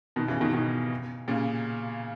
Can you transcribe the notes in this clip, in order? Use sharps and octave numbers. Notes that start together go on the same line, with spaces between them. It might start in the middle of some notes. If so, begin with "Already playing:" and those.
B2 D#3
C#3 E3
B2 D#3
B2 D#3
A#2 C#3